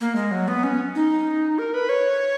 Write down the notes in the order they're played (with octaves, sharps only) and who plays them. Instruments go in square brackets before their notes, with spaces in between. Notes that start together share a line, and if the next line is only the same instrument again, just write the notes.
[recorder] A#3
G#3
F#3
B3
C#4
D#4
A#4
B4
C#5